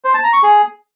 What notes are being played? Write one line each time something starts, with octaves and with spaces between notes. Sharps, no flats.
C5
A5
A#5
C#6
G#4